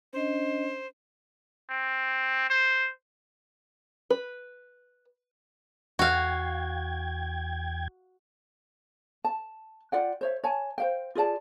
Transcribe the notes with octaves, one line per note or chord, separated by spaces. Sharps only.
C#4 D4 C5 D#5
C4
C5
B4
E2 F#4 F5 G5 G#6
A5
F4 D5 F#5 G5
C5 C#5 E5
C#5 G#5 A5
C5 F5 G5
F4 G#4 D5 A5